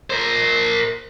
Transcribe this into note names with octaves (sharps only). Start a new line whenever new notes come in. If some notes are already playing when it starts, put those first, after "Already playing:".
A#4 C5